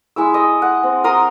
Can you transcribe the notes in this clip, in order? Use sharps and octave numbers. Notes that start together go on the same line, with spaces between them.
G#3 E4 E6
D#5
F#5
C4
A#4 A#5 C6 D#6